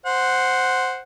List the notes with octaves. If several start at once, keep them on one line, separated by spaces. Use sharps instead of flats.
C5 F#5